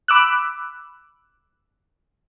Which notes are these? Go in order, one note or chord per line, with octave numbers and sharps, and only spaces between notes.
B5 D6 E6 F#6